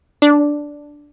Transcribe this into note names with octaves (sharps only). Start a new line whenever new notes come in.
D4